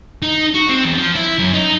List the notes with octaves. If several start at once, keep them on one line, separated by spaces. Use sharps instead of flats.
D#4
F#4
C4
E2
F3
E4
F#2
D#4